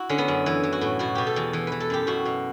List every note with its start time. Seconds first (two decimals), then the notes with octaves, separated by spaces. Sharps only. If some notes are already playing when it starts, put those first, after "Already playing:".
Already playing: E4 F#4
0.09 D3 C#4
0.18 B3
0.28 F#2
0.46 E3 E4
0.63 E3
0.73 F#4
0.81 A2
0.99 B2 F#4
1.15 B2 G4
1.26 A4
1.36 E2
1.53 E3
1.67 E3 B4
1.80 A4
1.90 F#2 G4
2.07 B2 F#4
2.25 B2